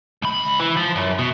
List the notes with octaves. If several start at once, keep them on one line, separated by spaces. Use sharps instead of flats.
C#2 B5
E3
F3
F#2
B2